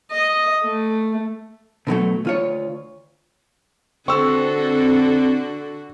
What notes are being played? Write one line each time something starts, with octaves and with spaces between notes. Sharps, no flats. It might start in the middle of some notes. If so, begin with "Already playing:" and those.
D#5
A3
B2 D3 F#3 A3
D2 F4 C#5
D3 C4 F#4 A4 C#6 E6